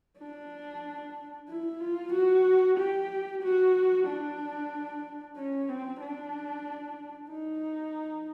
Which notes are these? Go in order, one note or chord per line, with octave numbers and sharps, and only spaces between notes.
D4
E4
F4
F#4
G4
F#4
D4
C#4
C4
D4
D#4